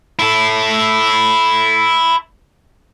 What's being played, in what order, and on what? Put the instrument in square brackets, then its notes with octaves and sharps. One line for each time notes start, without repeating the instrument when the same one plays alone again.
[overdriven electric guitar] E4 A4